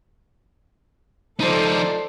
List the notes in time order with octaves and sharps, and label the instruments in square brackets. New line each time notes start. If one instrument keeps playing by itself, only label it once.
[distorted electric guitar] F3 D#4 [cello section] A4 C5 D5